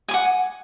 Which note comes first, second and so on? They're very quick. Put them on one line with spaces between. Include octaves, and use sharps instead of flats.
G#5 D6 F#5